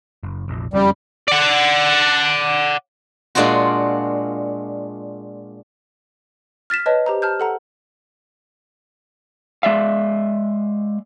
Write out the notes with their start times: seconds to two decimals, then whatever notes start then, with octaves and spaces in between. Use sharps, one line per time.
0.23 F#1
0.48 F1 A#1
0.74 F#1 F2 G3 C#4
1.28 D5 F#5
3.35 A#2 G#3 D4 F4 F#4
6.70 F6 A6 B6 E7
6.86 B4 C#5 D#5 A5
7.06 G4 C5 A#5
7.22 A5 F6 G6
7.40 A4 F#5 A#5
9.63 G#3 D5 E5 F5